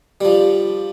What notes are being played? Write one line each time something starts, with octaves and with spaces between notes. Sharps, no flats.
F3 G3